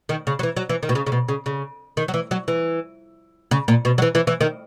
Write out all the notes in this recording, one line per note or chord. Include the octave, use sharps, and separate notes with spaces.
D#3
C#3
F#3
E3
F#3
E3
D#3
B2
C#3
C#3
B2
C#3
C#3
D#3
F#3
E3
F#3
E3
C#3
A#2
B2
F#3
E3
E3
E3
D#3